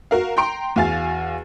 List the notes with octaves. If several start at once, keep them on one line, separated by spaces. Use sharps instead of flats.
F#4 A#4 F5
G5 A#5 C6 D7
E2 F#4 F5 G#5 A6